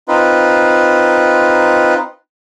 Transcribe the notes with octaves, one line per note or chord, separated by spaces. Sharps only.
C4 D#4 F4 B4